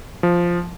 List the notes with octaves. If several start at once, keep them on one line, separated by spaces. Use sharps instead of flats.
F3